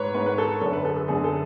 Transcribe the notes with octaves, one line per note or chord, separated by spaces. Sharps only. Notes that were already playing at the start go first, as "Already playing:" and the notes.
Already playing: G#2 B4 C#5
G#2 B4
B4
A4
F#2 D3 A4
B4
A4
A4
F#2 D3 G#4
A4